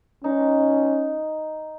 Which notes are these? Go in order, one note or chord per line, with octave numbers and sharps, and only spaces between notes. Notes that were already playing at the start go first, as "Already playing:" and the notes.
C#4 D#4